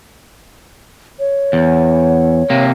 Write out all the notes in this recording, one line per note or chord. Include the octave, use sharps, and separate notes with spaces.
C#5
E2
C3 A#3